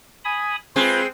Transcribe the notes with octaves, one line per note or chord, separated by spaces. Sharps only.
G#5 B5 D#6
G#3 C4 F4 G#4 B4